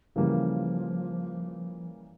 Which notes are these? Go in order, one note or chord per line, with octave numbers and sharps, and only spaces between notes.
C#3 E3 F3 G3 A#3